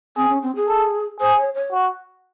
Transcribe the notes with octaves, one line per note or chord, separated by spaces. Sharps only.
C4 G#4
C#4
C4
G#4
A4
G#4 C5
C#5
C#5
F#4